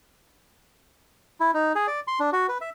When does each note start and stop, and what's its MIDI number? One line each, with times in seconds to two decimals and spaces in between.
1.40 1.51 64
1.54 1.73 63
1.75 1.87 68
1.87 2.00 74
2.08 2.19 84
2.20 2.30 62
2.33 2.47 66
2.49 2.58 71
2.61 2.70 76